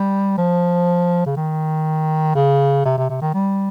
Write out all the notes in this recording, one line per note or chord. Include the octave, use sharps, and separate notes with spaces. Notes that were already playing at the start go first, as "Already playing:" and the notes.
Already playing: G3
F3
C#3
D#3
C#3
C3
C3
C3
D#3
G3